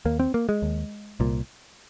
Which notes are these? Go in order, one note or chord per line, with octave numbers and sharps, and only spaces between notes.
D#2 A#3
C4
A#3
G#3
D#2
C2 A#2